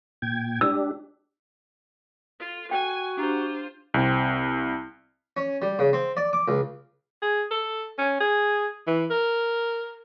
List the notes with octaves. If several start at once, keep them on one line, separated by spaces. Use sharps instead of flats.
A#2 G5 G#6
D4 G4 E6
F4 A4
F#4 G5 G#5
D4 F4 G4 C5 A#5
C2 C4
C#4
G3
C#3
C4
D5
D6
C#2
G#4
A4
C#4
G#4
E3
A#4